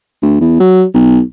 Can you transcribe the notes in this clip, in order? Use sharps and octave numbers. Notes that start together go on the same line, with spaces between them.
D2
E2
F#3
B1